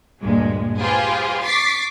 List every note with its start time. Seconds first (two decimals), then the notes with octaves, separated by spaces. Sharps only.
0.22 D2 G2 A#2 G#3
0.80 F4 G4 G#4 B4 C5
1.45 C#6 D6 A6 B6 C7